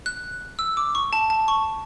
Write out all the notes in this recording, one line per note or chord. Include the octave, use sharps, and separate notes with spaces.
F#6
E6
D6
C#6
A5
A5
C#6